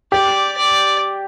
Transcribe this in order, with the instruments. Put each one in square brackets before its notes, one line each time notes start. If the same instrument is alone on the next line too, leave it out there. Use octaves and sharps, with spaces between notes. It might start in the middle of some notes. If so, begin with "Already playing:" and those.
[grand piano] G4 [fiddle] D5
[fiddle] D5